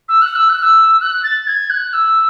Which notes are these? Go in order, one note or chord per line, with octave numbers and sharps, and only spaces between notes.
E6
F#6
E6
F#6
E6
F#6
A6
G#6
F#6
E6